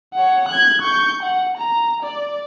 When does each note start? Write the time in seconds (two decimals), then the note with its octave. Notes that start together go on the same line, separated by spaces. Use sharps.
0.14 C#5 F#5
0.49 F#6 G#6
0.82 C#6 G6
1.23 F#5
1.57 A#5
2.03 D5